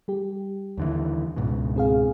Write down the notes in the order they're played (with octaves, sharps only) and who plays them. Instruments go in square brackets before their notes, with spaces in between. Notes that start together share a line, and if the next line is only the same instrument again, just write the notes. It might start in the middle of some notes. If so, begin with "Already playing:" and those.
[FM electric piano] G3 G4
[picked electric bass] D#2 D3 E3
C#2 G#2 B2
[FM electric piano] C4 G#4 F5